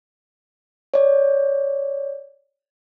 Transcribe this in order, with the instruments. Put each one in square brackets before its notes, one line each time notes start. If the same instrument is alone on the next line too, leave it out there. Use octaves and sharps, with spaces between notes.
[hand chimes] C#5 D5